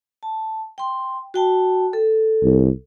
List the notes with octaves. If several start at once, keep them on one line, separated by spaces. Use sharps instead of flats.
A5
G5 C6
F#4 G5 A5
A4
C2